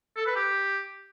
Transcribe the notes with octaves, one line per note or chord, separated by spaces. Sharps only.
A4
B4
G4